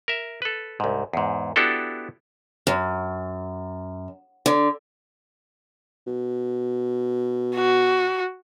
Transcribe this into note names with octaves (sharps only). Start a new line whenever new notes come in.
A#4 E5
A4 B4
C2 G#2
E2 G#2
B3 D4 E4 F#4 G4 A4
F#2
D3
B2
F#4